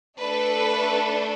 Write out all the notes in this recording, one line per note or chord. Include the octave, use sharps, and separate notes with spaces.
A3 D4 A4 B4 D5